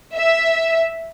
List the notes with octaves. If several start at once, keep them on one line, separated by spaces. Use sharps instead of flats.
E5